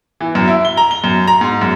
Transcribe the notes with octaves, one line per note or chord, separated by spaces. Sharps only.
E3
F#2
E4
G7
A#5
G7
F#2
A#5
G#2
F#2